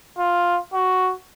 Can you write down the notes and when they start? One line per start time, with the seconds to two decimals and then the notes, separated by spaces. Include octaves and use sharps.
0.18 F4
0.73 F#4